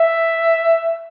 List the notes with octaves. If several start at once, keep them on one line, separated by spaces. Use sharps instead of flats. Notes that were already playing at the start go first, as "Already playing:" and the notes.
Already playing: E5